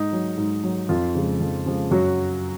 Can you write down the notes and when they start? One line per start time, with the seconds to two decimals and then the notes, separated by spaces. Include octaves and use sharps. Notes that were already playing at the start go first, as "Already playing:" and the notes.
Already playing: G#2 D#4
0.13 F#3
0.37 G#2
0.64 F#3
0.89 F2 F4
1.15 C#3 F3 G#3
1.41 F2
1.66 C#3 F3 G#3
1.91 F#2 F#3 F#4